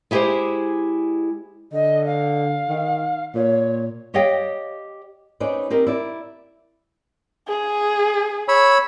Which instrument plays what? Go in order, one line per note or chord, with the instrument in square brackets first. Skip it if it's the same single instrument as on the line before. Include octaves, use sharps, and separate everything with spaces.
[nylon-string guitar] G#3 E4 G4 G#4 C5
[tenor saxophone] D3 [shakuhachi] D#5
[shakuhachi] F5
[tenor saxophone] D#3
[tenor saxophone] A#2 [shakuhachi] C#5
[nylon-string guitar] G4 C#5 D#5 F5 G5
C#4 D#4 G#4 B4 C5 D5
C4 D#4 G4 A#4
E4 D5
[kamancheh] G#4
[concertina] C#5 B5 E6